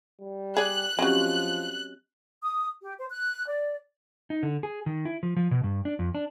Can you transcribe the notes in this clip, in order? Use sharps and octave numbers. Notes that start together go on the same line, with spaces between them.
G3
G#4 D5 F#6
F3 F#3 G#3 C4 C#4 G4
D#6
G4
C5
F#6
D5
D#4
D3
G#4
D#3
E4
F3
F3
B2
G2
D4
F2
D4